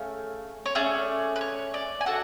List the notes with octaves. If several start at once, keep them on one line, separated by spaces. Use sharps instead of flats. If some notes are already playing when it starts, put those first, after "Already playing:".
Already playing: A3 C#4 G#4 F5
C#5
A3 C#4 G#4 D5
B4
C#5
D5
G#5
D4 F#4 A4 F#5